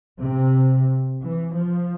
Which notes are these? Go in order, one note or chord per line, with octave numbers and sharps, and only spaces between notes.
C3
E3
F3